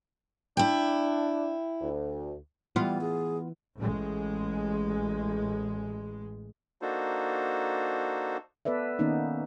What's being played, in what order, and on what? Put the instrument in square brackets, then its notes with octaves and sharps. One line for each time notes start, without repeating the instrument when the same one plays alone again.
[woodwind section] D4 [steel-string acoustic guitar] E4 G5
[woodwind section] D2
[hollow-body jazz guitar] E3 [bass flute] G3 [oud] B3 F4
[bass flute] G#4
[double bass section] A1 G#3
[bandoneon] A#3 D4 D#4 F#4 A4 C5
[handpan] B3 A4 B4 D5 E5
D#3 A#3 B3 C#4 D#4